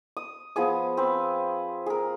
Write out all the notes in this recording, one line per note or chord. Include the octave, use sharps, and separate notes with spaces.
D#6
F3 B3 G#4 D#6
C4 B4
G#4 A#4